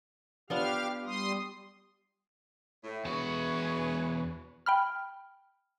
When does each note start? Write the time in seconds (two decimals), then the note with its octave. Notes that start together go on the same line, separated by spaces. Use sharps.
0.50 B3 D4 F4 G4 F5 F6
1.06 G3 C6 D#6
2.84 A2
3.05 E2 F#4 G#4 B4 C#5
4.66 G5 B5 F6